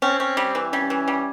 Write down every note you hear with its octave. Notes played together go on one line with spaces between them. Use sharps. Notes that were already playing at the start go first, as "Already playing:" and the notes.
C4 C#4
C#4
G3
E3
G3 C#4
E3
G3